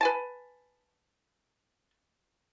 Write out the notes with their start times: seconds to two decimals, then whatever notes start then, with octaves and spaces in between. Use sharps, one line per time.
0.01 B4 G#5 A5